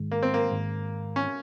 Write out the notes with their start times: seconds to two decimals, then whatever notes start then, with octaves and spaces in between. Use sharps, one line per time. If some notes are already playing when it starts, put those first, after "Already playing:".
Already playing: G#2 D#3 G#3
0.12 A#3
0.23 C4
0.34 A#3
0.50 G#2 D#3 G#3
1.16 C#4